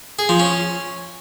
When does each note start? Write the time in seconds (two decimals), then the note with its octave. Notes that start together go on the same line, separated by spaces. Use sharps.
0.19 G#4
0.29 F3
0.40 C#4